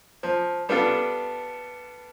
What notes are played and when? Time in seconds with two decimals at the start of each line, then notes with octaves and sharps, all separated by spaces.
0.23 F3
0.69 G3 B3 D4 F4 A4